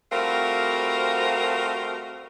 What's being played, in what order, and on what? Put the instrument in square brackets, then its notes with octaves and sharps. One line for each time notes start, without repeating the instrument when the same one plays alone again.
[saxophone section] G3 A3 C4 F4 F#4 A#4